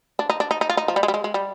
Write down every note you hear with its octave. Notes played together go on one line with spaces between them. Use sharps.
D4
D#4
D4
D#4
D#4
F4
D#4
F3
G3
G#3
G3
G#3
G#3
G3